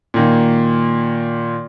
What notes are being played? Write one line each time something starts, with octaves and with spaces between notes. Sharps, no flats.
A#2 D#3 A#3